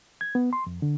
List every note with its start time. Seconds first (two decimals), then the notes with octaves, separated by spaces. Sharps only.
0.21 G#6
0.35 B3
0.53 C6
0.67 F2
0.82 D3